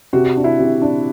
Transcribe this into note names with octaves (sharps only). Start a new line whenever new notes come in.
C3 F#4
D4
E4
C3
D4